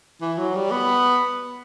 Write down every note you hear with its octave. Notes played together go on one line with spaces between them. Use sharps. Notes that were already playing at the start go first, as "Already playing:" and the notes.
E3
F#3
G3
B3